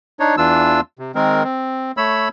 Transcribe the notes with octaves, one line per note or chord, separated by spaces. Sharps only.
D4 D#4 C#5
E2 E3 D4 F4 E6
C3
D#3 G#3 C4 A#4
C4
A3 C#5 B5 E6